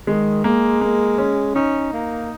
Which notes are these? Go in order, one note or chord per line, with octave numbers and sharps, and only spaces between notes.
D#3 G#3
G#3 A#3
A#3
C#4
C#4 D#4
A#3